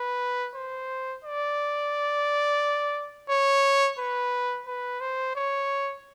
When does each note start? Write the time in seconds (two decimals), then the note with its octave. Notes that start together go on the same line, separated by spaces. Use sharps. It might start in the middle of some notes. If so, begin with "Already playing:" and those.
Already playing: B4
0.55 C5
1.24 D5
3.30 C#5
3.99 B4
4.67 B4
5.01 C5
5.35 C#5